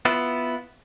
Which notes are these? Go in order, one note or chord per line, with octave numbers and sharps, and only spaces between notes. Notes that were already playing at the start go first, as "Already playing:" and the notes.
B3 E4 F4